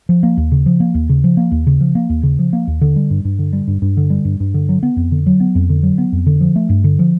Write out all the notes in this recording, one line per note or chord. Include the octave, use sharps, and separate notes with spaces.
F3
A#3
D#2
C#3
F3
A#3
D#2
C#3
F3
A#3
D#2
C#3
F3
A#3
D#2
C#3
F3
A#3
D#2
D3
G3
G2
G2
D3
G3
G2
G2
D3
G3
G2
G2
D3
F#3
B3
F2
D3
F#3
B3
F2
D3
F#3
B3
F2
D3
F3
A3
G2
D3
F3